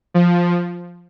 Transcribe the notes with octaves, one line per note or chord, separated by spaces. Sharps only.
F3